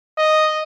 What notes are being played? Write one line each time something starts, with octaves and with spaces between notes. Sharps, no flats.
D#5